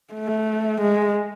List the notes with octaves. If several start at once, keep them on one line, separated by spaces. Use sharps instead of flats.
A3
G#3